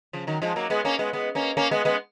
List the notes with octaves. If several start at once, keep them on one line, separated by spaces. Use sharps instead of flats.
C#3 F3
D#3 F#3
F3 G#3
F#3 A#3
G#3 B3
A#3 C#4
G#3 B3
G#3 B3
A#3 C#4
A#3 C#4
G#3 B3
G#3 B3